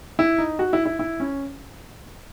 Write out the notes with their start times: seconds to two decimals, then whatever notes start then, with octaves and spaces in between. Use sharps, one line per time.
0.19 E4
0.38 D#4
0.59 F#4
0.73 E4
0.86 E4
0.99 E4
1.20 C#4